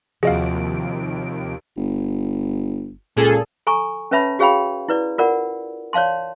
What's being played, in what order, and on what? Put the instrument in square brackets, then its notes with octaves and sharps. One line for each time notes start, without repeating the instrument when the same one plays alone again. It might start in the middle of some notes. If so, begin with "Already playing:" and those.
[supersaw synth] D#2 D7 [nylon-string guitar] C3 F3 F#4 [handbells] G#4 D#5 F5
[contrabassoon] G1
[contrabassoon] C#2 [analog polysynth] A#2 G#4 A4
[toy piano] A4 G#5 A#5 C#6
C#4 B4 C#5 E5 A5 B5
F#4 G#4 C#5 F5 G5 B5
E4 B4 D5
F4 A#4 D5 F#5
C#5 D5 F5 A5 C6